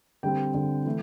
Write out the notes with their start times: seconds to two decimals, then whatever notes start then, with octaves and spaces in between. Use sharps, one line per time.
0.23 D3 G3 C4 G5
0.54 D3 G3 C4
0.86 E3 A3